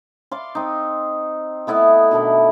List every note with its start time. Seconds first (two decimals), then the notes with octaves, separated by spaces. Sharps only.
0.31 D5 F5 C6
0.55 C4 D#4
1.67 A3 B3 E4 D#5
2.11 B2 D#3 D4 E4